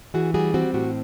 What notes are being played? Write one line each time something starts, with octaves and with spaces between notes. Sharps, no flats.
E3 F#4 G#4
G3 F#4 G#4
C4 F#4
A2 F#4